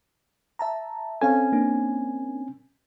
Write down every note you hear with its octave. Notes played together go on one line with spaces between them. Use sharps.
E5 A5 A#5
C4 C#4 A4 F5 G#5
A#3 D4